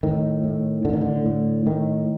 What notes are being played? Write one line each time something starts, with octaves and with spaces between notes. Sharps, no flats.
A2 D#3
A2
A2 D3
D#3
D3
A2
A2 D#3